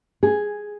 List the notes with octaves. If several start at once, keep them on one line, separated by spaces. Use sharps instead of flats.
G#4